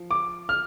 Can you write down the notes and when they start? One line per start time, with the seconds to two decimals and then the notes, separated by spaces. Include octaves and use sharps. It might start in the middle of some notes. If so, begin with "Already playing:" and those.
Already playing: F3
0.11 D6
0.49 F6